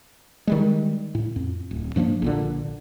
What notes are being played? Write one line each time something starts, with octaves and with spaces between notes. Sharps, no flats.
D#3 G3 G#3
A2
F2
D1
G2 F3 A#3 D4
A#1 A#2 D3